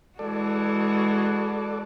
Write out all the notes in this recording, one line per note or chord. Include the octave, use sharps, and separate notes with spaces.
E3 G#3 F#4 A4 D5